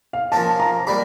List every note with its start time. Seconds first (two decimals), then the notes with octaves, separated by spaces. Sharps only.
0.13 F5
0.32 F3 A#3 C#4 A5
0.60 A#5
0.87 G3 A#3 D4 G4 B5